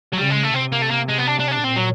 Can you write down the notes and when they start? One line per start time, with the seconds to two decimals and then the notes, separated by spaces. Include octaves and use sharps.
0.13 F#3
0.18 C#3 G3
0.30 G#3
0.43 A3
0.54 C3 C4
0.73 A#3
0.82 A3
0.91 A#3
1.09 G#3
1.19 B3
1.28 D4
1.40 D4
1.48 C#4
1.52 D4
1.64 A#2 C4
1.76 F#3